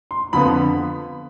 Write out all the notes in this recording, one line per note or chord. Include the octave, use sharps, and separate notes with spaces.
C6
F2 D3 F3 B3 B5